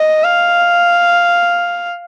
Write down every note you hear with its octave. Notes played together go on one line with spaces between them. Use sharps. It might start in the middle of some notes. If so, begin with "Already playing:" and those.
Already playing: D#5
F5